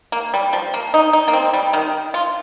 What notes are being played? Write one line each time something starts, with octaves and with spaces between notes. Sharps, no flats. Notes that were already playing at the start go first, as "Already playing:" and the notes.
A#3
G3
F3
A#3
D#4
D#4
A#3
C4
G3
D#3
F4